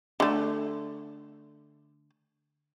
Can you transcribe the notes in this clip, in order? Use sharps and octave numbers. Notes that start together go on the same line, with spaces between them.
D3 A3